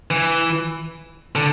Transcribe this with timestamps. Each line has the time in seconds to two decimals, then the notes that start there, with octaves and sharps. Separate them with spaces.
0.11 E3
1.35 D3